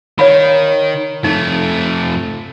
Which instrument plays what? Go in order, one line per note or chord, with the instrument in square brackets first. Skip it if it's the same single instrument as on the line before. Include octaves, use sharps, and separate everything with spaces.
[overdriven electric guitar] D#3 [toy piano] C#5 F5 B5
[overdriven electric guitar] F2 A3 [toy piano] D#4